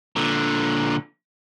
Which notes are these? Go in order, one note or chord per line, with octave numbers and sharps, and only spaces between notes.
A#2 D3